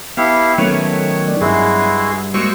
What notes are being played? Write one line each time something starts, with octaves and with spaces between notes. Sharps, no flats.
B3 E4 G4 F5 A5
D#3 F#3 A3 B3 C#4 C#5
D5
G2 G#3 E4 F#4 G#4
G#3 A#3 F#4 C5 C#6 E6